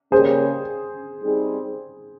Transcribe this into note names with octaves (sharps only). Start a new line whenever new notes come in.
C#3 G3 A#3 C#4 G4 G#4 C5
G3 C4 D#4 G#4